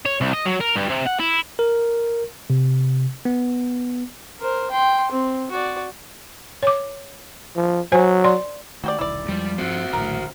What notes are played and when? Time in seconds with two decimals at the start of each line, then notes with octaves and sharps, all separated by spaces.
0.06 C#5
0.21 C2
0.33 D#5
0.45 F#3
0.60 A#4
0.76 G2
0.89 C3
1.06 F#5
1.20 E4
1.59 A#4
2.50 C3
3.25 B3
4.40 A#4 C5
4.71 G5 C6
5.11 C4
5.51 F#4 D5
6.63 C#5 D6
7.56 F3
7.92 F#3 C5 G#5
8.24 D5 C6
8.84 D#3 A3 F#4 G4 D5
8.99 E1 C2 D#3 E4 D5
9.29 F2 F3 G3 G#3
9.58 G2 C4 F#4 C5
9.93 A#1 D#2 A2 D3 A#4